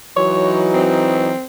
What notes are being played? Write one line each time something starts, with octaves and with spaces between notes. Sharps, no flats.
E3 F#3 D#4 C#5
C4